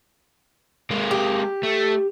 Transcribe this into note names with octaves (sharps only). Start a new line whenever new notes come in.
G#3 A#3
G4
A3